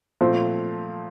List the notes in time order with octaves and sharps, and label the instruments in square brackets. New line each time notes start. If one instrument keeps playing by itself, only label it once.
[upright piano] A#2 F3 A3 C4